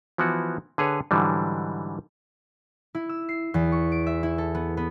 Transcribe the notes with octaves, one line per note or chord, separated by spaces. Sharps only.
E3 F3 B3 E4 F#4
D3 G#4 B4 C#5
G#2 D3 E3 F#3 G3
E4
E6
C7
E2
C#6
D7
E5
E4
A4
B3
B3